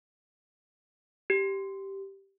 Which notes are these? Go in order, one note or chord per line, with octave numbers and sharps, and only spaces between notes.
G4